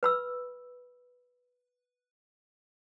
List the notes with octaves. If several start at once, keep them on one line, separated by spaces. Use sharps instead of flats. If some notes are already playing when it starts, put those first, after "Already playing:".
B4 B5 E6